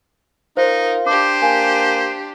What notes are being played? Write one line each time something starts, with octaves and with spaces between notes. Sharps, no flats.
D#4 F4 A#4 C5
D4 G4 C5 D6
A#3 G#5